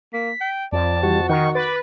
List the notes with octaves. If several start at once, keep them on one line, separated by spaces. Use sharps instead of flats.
A#3 B6
G5
F2 D5 A5
E3 G3 F#4 G4
D#3 D#5 F#5 G5 C#6
B4 D6 A6